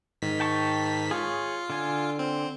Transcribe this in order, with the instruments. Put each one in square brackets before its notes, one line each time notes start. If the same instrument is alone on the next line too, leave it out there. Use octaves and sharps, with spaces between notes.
[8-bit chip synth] G#2 D#3 B6
[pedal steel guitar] G5 A5 C#6
[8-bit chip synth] F4 [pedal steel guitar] G#4 C#5
[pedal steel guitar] D3 G#5
[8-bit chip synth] C4